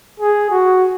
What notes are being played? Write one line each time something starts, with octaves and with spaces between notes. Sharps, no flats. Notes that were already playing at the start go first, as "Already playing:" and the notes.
G#4
F#4